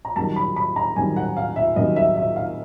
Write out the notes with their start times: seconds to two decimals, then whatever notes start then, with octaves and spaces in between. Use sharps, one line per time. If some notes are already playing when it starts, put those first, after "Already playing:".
0.05 A#5
0.16 F#2 D#3 G3 A5
0.36 B5
0.56 B5
0.76 A#5
0.96 F#2 D#3 G3 G#5
1.16 F#5
1.37 F5
1.56 E5
1.76 F#2 D#3 G3 D#5
1.96 E5
2.16 E5
2.36 F5